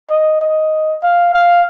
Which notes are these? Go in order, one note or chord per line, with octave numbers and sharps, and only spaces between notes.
D#5
D#5
F5
F5